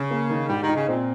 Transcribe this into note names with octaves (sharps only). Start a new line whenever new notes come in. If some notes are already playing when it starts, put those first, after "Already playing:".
Already playing: C#3
A#3
D#3
G#2 G3
D#3
D#4
C#3
A#2 C4